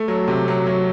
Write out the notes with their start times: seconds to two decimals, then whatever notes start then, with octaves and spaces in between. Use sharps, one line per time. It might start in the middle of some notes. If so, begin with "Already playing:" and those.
Already playing: A3
0.08 F#3
0.28 C3
0.48 F#3
0.67 F#3